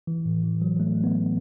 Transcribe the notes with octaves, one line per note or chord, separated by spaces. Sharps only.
E3
A2
E3
F#3
A3
B3